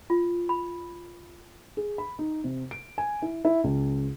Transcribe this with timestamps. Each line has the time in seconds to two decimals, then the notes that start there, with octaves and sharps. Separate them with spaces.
0.10 F4
0.49 B5
1.77 G#4
1.98 B5
2.19 D#4
2.44 C3
2.71 D7
2.98 G#5
3.22 E4
3.45 E4
3.64 C#2